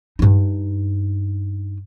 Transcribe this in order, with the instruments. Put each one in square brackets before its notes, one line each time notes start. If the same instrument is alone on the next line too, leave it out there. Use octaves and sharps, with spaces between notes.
[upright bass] G2 D#4